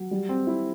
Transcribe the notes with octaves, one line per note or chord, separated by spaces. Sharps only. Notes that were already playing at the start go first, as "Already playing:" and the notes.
Already playing: F#3
G3
C4
E4